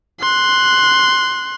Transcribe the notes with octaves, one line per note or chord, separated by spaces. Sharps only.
C6 F#6